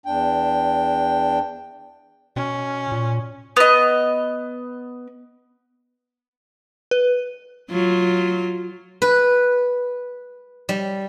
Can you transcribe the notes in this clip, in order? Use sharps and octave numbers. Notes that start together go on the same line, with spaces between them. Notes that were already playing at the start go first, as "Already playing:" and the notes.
E2 D4 G5
B2 C#4
A#2
B3 D#5
B4
F#3 F4
B4
G3